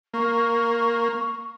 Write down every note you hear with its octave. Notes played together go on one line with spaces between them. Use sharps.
A#3 C#6